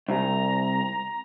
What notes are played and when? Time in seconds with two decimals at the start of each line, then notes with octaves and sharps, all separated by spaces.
0.09 C2 A#5